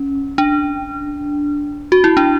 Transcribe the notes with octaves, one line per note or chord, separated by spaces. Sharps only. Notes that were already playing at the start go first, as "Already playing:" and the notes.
Already playing: C#4
D4
F#4
E4
D4